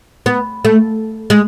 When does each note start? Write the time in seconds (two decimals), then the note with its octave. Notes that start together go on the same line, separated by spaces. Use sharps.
0.26 B3
0.65 A3
1.30 G#3